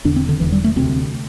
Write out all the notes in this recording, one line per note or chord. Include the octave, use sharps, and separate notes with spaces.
E1 E2 D3 D4
C4
D3
E1 E2 D3 E3
G3
A3
D2 C3 C4